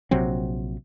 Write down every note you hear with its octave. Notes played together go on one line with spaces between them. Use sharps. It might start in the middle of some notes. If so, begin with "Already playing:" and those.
A#1 C3 F#3 C4